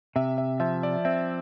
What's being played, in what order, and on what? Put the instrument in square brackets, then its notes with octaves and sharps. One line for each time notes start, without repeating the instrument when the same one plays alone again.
[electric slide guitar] C3 [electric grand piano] E5
[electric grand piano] E5
[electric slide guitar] F3 [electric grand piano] E5
[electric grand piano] D5
[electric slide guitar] C4 [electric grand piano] E5